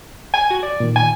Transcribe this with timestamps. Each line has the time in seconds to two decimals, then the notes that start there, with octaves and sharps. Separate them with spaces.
0.34 G#5
0.50 F#4
0.62 D5
0.80 A#2 D#3
0.96 G#5